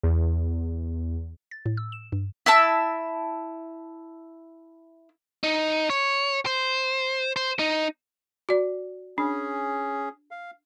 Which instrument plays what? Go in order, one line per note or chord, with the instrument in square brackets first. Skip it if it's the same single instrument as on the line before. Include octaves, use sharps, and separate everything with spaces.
[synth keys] E2
[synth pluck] A6
A2
E6
E7
G2
[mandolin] E4 E5 A5 E6
[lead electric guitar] D#4
C#5
C5
C5
D#4
[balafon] F#4 D5
[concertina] C#4 G#4 [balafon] D4
[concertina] F5